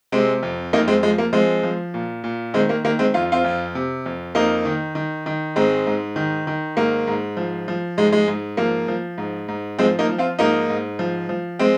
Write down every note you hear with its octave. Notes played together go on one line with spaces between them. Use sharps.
C3 G#3 C4
F2
F2 A#3 D#4
G#3 C4
F3 G#3
A#3
F3 G#3 C4
F3
A#2
A#2
D#3 G#3 C4
A#3
D#3 A#3
G#3 C4
F2 F4
C4 F4
F2
C3
F2
F2 A#3 D#4
D#3
D#3
D#3
G#2 G#3 C4
G#2
D#3
D#3
G#2 A#3
G#2
F3
F3
G#2 G#3
G#3
G#2
F3 A#3
F3
G#2
G#2
F3 G#3 C4
A#3 D#4
F3
C4 F4
G#2 A#3 D#4
G#2
F3
F3
G#3 C4